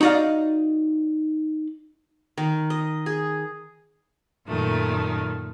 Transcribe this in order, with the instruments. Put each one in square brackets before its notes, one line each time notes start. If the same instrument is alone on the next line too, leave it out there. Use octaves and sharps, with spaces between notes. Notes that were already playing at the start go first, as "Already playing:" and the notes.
[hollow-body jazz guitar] D#4 F#4 D5 D#5 F5
[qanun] D#3
D#5
G#4
[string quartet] F#2 A#2 D#3 A3